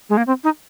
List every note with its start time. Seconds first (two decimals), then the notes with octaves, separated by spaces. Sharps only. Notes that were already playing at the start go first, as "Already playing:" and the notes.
0.09 G#3
0.17 A#3
0.27 C4
0.44 D#4